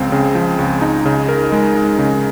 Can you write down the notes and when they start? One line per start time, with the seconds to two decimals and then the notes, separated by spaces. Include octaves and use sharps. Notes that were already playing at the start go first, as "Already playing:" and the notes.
Already playing: C#2 F3 C4
0.12 C#3
0.35 F3
0.59 C#2
0.82 D#4
1.05 C#3
1.29 A#4
1.52 G#3
1.75 D#4
1.99 C#3